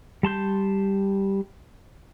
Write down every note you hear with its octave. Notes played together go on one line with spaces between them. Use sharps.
G3 A5 C6 G6